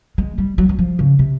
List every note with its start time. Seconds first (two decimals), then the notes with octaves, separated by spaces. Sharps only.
0.18 G#3
0.38 G3
0.58 F#3
0.69 F#3
0.79 F3
0.99 C#3
1.19 C3